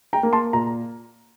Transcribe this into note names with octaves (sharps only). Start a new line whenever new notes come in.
G5 A#5
A#3
A5 C6
A#2 A#5